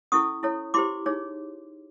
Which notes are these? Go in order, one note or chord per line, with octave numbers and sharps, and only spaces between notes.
C#4 E4 A4 C#6 D#6
E4 A4 C#5
E4 G4 C5 C6 D6
D#4 G#4 C#5